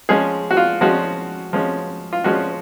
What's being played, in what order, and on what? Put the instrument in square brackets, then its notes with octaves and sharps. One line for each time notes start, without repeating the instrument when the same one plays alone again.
[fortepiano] F3 G#3 C#4 G#4
F#4
F4
F3 G#3 C#4 F#4
F3 G#3 C#4
F4
F3 G#3 C#4 F#4